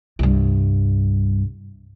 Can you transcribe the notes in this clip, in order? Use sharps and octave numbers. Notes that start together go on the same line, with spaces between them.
C2 G2